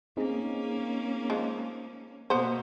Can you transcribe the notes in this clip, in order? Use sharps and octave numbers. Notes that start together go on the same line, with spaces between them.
A#3 C4 C#4 D#4 G#4
F3 G#3
B2 A#3 B3 C5